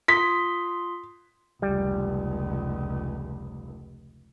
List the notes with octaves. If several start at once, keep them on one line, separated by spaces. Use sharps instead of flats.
F4 C6 D#6 B6
F1 C#2 G3